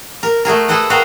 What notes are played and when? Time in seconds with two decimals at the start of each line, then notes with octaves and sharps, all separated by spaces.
0.23 A#4
0.45 A3 F#4 G#4 A#4
0.68 G#4 A4 B4 D#5 F#5
0.90 F#4 A#4 B4 D#5 F5 G5